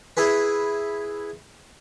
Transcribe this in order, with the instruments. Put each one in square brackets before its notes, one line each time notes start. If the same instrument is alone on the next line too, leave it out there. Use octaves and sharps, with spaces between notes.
[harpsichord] E4 G#4 B4